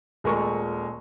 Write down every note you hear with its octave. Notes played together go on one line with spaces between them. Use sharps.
D#1 G#3 A3 A#4 C#6